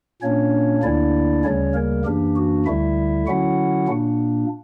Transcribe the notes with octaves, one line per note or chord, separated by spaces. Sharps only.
A#2 A#3 C#4 D4 C#5
D2 D3 A#3 D4 E4 D5
D2 C#3 G3 C#4 C#5
A#3 A#4
F#2 E3 A#3 D4 G4
F#4
D2 D3 G3 E4 E5
D3 F#3 C#4 E4 F#4 F#5
A#2 A#3 D4